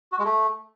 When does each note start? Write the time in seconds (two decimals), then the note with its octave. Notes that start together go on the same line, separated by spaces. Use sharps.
0.12 F#4
0.19 G#3
0.25 A3